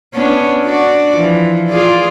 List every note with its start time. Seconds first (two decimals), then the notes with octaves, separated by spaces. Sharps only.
0.14 B3 C#4 D4
0.64 D4 F#4 D5
1.17 E3 F3
1.69 F4 G#4 D5